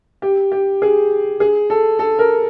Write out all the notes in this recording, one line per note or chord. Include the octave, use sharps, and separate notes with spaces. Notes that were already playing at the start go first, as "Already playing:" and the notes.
G4
G4
G#4
G#4
A4
A4
A#4